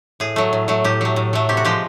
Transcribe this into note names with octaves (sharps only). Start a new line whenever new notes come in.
A2 G#4
F#3 A3
A2
F#3 A3
A2 G4
F#3 A3
A2
F#3 A3
C3 G4
F#4
F3 G#3 G4